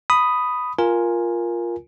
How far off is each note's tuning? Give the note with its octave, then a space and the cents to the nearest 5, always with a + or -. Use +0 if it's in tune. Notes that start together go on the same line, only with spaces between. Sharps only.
B5 +5 D#6 +0
F4 +0 A#4 +10 G#5 +0